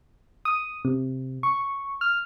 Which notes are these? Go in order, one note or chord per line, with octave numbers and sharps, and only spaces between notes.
D#6
C3
C#6
F6